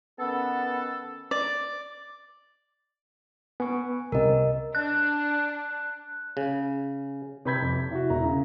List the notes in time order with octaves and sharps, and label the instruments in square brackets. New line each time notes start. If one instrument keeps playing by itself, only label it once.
[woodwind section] D#3 C#4 A4 [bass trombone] B3
[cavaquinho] D5
[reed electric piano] B3 C#6 [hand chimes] G#5
[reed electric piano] C2 C3 [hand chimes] A#4 D#5
[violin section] D4 [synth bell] F#6
[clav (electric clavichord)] C#3
[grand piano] C3 B4 B5 G6 G#6 B6
F2
C3
E4 F#4
E1 E4 A#5
C#3